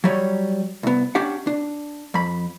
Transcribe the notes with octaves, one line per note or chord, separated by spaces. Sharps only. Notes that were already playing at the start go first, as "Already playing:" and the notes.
F#3 G3 C#5
C2 B3
C#4 D4 G4 F#5
D4
F2 B5